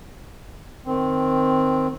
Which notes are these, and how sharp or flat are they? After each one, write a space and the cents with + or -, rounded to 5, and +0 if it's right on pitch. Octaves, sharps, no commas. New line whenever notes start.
D#3 +0 C4 +0